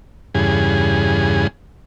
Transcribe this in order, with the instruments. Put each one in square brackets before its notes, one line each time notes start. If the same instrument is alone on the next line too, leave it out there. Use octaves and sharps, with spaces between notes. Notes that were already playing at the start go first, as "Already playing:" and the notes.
[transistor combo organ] E2 G2 C#3 G#4